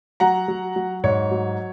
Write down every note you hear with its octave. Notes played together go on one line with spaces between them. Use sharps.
F#3 F#5 A#5
F#3
F#3
G#2 C#5
F#3